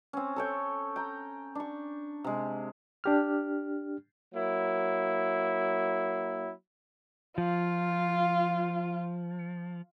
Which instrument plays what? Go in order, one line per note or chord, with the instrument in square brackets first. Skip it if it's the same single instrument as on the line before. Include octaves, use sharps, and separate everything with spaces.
[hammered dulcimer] C4 C#4
A4 C#5 G5
G5 A#5
D4 C#6
C3 G#3
[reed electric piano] D4 G4 F6
[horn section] F#3 A#3 E4
[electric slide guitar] F3 [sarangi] F4